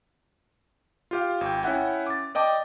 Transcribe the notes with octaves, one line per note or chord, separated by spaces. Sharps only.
F4 G4 F5
G#1 G5
C#4 E4 E5 F#5 G5
D6 A6
D5 D#5 G5 A5 D6